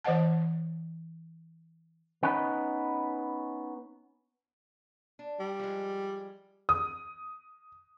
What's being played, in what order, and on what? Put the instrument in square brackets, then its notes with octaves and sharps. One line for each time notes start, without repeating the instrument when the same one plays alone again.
[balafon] E3 C5 D#5 F#5 A5
[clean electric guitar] B3 C#4 D#4 B4
[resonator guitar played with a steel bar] D4
[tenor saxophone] G3
[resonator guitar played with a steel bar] F3 G#3
[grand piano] D#6